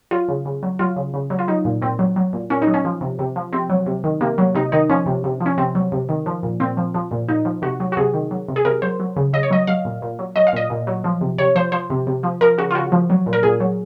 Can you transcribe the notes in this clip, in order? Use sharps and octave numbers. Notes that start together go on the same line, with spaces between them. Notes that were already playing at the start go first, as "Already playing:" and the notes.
F#3 F4
C#3
C#3
F#3
F#3 F4
C#3
C#3
F#3
F4
F#3 D#4
A#2
A#2 C4
F#3
F#3
A#2
A#2 C#4
D#4
F#3
C#4
F3
C3
C3
F3
C3 C4
F#3
C3
D#3
C3 A#3
F#3
C3 D#4
D#3 D#4
F3 C#4
C3
C3
F3
C#4
C3 C4
F#3
C3
D#3
F3
A#2
A#2 C4
F3
F3
A#2
A#2 D#4
F3
C3 F#4
F#3
F#4
C3 G#4
D#3
F#3
C3
G#4
C3 A#4
F#3 C5
F#3
C#3
C#3 D#5
C#5
F#3 D#5
F#3 F5
A#2
A#2
F#3
F#3 D#5
F5
A#2 D#5
A#2
F#3
F3
C3
C3 C#5
F3 C5
F3 C5
C3
C3
F3
F3 A#4
C#3 F#4
F4
C#3 F#4
F3
F#3
A#2
A#4
A#2 G#4
F#3